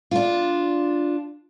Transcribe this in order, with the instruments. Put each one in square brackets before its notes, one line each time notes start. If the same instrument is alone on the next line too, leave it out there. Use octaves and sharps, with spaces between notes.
[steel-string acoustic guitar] D4 F4